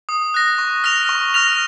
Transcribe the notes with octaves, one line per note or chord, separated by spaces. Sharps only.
D#6
F#6 A#6
C#6
F6 A#6 F7
C#6
F6 A#6 F7